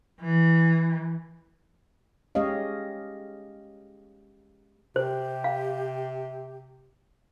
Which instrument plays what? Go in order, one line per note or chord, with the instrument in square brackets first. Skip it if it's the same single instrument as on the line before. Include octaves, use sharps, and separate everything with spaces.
[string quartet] E3
[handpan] G#3 C#4 G4 C#5 D#5 F5
[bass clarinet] C3 [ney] G4 [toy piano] C5
[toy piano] F5